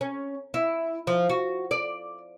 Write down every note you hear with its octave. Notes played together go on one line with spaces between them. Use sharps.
C#4
E4
F3
F#4
D5